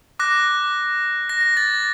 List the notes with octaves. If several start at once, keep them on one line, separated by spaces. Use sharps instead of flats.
D6 F#6 A#6
A#6
A6